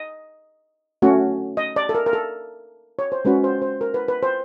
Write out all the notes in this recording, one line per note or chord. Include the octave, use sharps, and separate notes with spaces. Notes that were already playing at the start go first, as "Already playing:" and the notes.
Already playing: D#5
A3 C#4 F#4
D#5
D5
A4
A#4
A#4
A4
C#5
C5
G#3 C#4 F#4 B4
C5
C5
A#4
B4
B4
C5